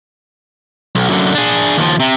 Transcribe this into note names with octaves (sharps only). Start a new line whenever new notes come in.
B1
F#2 D3
D4 G#4
D#2 F3
C3